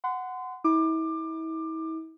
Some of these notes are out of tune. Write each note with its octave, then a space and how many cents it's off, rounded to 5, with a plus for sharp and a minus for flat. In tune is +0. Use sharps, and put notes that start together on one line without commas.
F#5 +0 C6 -35
E4 -40 D6 +25